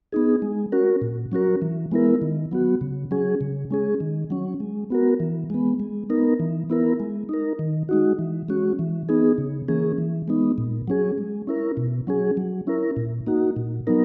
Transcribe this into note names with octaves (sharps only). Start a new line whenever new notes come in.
B3 D#4 G#4
G#3
C#4 F#4 A#4
A#2
F#3 C#4 F#4 A#4
E3
G#3 B3 E4 A#4
D#3
F#3 B3 F#4
C#3
F#3 C#4 G#4
C#3
G#3 C#4 G#4
D#3
F#3 C#4
G#3
B3 F#4 A#4
E3
G#3 B3
G#3
B3 D#4 A#4
E3
B3 E4 A#4
G#3
D#4 A#4
D#3
G#3 D#4 F#4
E3
G#3 C#4 F#4
E3
B3 D#4 G#4
C#3
E3 A#3 C#4 G#4
E3
G#3 B3 D#4
A#2
F#3 C#4 G#4
G#3
C#4 E4 A#4
B2
F#3 C#4 G#4
F#3
C#4 E4 A#4
A#2
A#3 D#4 F#4
A#2
F#3 B3 D#4 A#4